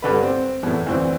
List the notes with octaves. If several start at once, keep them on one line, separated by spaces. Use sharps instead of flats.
G2 D3 B4
C4
E2 A2
D2 E3 C4